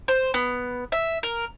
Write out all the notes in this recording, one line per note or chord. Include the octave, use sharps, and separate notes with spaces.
C5
B3
E5
A#4